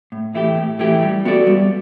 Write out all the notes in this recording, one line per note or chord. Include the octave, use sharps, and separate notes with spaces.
A2
E3 A3 E4 G4
A2
E3 A3 E4 G4
G3
B3 F#4 A4 D5
G3